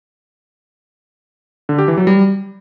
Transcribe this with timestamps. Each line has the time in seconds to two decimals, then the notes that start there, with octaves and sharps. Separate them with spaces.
1.69 D3
1.78 G4
1.88 E3
1.97 F#3
2.07 G3